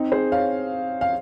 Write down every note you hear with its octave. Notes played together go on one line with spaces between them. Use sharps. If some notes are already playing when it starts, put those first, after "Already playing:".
Already playing: C4 D#4
G#4 C5
C#5 F5
F5